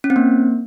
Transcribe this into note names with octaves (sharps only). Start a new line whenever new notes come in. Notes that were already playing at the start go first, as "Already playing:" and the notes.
C#4
C4
A#3